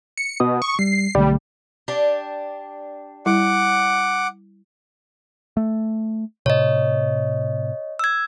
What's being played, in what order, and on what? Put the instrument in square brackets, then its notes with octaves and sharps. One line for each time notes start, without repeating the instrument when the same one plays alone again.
[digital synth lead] C#7
[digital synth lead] B2 [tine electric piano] D#6
[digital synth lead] C#6
[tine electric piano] G3 [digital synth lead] C7
[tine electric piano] B1 D3 A3 [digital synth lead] G3
[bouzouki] D4 G4
[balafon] G3 E4 [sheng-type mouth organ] F#5 D6
[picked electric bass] A3
[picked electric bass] A2 C3 [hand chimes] C#5 D#5
[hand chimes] E6 G#6